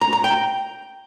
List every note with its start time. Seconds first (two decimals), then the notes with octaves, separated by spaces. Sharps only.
0.01 A#5
0.13 A#5
0.24 G5